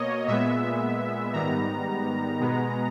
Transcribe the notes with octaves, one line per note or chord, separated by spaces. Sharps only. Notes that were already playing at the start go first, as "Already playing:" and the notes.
Already playing: B2 A#3 C#5 D#5
A#2 G#3 B3 E5
G#2 D#3 G3 B3 A#5
B2 G#3 B3